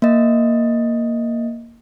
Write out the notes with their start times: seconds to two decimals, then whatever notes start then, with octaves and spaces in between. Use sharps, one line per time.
0.02 A#3 D#5